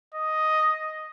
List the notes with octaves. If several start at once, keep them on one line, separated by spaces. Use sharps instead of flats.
D#5